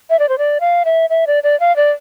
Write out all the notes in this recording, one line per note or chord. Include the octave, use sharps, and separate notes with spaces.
E5
D5
C5
D5
F5
E5
E5
D5
D5
F5
D5